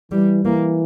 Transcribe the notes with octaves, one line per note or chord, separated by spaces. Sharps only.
E3 G3
E3 A#3